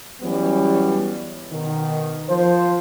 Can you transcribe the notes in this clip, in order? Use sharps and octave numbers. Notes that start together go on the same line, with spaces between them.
E3 F#3 G3 B3 C#4
B2 D#3
F3 C5